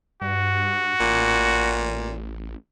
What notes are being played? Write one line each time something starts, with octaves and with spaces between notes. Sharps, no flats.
G2 F#4
A1 A#2